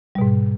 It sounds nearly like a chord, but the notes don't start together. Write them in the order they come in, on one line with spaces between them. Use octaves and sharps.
G3 B2 G#2